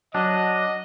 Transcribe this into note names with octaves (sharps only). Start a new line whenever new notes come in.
F#3 D4 D#5